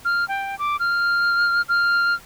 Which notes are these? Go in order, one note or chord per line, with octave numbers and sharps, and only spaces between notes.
F6
G5
D6
F6
F6